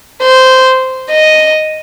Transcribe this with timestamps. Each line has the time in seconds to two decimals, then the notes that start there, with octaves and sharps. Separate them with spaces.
0.22 C5
1.11 D#5